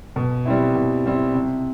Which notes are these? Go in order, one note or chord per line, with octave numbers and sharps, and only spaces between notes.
B2
G3 C4 E4
B2
G3 C4 E4
C3